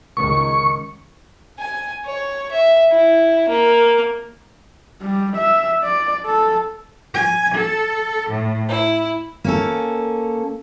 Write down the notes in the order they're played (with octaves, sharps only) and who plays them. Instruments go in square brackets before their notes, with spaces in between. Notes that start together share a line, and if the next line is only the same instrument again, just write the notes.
[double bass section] C#2 D#3 [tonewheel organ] C#6
[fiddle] G#5
C#5
E5
E4
A#3
[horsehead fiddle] G3
E5
D5
A4
[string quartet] G#5
A4
A2
E4
[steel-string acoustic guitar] A#3 C#4 A4